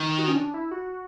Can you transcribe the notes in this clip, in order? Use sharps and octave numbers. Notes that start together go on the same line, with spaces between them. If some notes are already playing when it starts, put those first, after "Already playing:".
Already playing: D#3
F#4
C#4
D4
E4
F#4